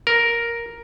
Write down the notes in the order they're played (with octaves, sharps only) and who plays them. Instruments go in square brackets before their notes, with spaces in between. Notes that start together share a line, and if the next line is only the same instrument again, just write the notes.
[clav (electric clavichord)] A#4